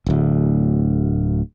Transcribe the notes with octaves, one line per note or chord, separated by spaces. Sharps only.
D1 D2